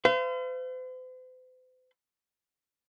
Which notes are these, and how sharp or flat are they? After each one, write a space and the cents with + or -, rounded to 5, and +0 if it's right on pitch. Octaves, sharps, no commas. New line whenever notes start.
C5 -45 F5 -40